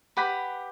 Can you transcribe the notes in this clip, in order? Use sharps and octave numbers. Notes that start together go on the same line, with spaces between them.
G4 B4 F#5 B5